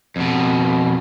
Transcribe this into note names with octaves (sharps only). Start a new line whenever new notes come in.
F2 B2